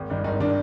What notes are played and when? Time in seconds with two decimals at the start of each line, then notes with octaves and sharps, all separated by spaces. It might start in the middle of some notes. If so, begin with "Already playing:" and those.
Already playing: G#1
0.10 G2 D#3
0.24 G#1 D#4
0.40 D#3 D4